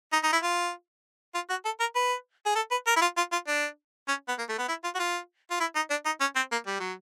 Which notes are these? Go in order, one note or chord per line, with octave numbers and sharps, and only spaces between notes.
D#4
D#4
E4
F4
F4
F#4
A4
A#4
B4
G#4
A4
B4
A#4
E4
F4
F4
F4
D4
C#4
B3
A#3
A3
B3
E4
F4
F#4
F4
F4
E4
D#4
D4
D#4
C#4
C4
A#3
G3
F#3